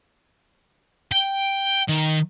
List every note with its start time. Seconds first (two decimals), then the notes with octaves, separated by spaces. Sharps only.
1.12 G5
1.88 D#3